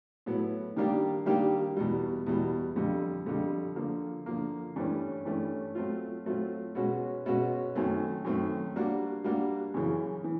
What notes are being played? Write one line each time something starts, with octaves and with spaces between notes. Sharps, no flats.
A2 F#3 B3
D#3 G3 A#3 D4 G4
D#3 G3 A#3 D4 G4
E2 B2 G3
E2 B2 G3
F2 D3 G3
F2 D3 G3
D3 F3 A#3
D3 F3 A#3
G2 E3 A3 C#4
G2 E3 A3 C#4
F#3 A3 C4 F4
F#3 A3 C4 F4
B2 G#3 C#4 F#4
B2 G#3 C#4 F#4
F#2 D#3 F#3 A3 C4
F#2 D#3 F#3 A3 C4
G3 A#3 D4 F#4
G3 A#3 D4 F#4
F#2 C#3 E3
E3